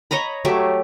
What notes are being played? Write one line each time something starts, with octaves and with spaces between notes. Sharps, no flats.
C#5 D#5 A#5 B5
F#3 A3 G4 E5